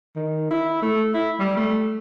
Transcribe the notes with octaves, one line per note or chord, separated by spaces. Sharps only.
D#3
E4
A3
E4
G3
A3